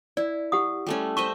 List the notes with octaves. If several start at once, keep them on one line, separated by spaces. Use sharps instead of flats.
E4 D5
G4 F#5 D#6
G3 A3 C#4
C5 D#5 E5 C#6